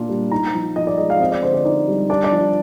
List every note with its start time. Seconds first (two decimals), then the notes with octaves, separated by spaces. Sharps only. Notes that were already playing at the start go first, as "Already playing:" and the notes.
Already playing: A#2 D4 F4
0.09 G3
0.31 D#4 A#5
0.54 F3
0.76 F3 D#5
0.87 D5
0.98 G#3 D#5
1.10 F5
1.20 C4 D#5
1.32 D5
1.42 D3 C5
1.54 D5
1.64 D#4 D5
1.87 G3
2.10 D4 D5
2.24 D5
2.32 F3